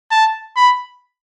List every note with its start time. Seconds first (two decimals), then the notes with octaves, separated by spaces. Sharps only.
0.12 A5
0.57 B5